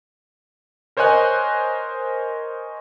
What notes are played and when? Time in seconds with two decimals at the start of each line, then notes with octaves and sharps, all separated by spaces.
0.97 A#4 C5 C#5 D#5 G#5 F#6